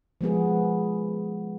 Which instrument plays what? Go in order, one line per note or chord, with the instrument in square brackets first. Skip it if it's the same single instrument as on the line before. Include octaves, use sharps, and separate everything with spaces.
[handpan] F3 G#3 B3 G#4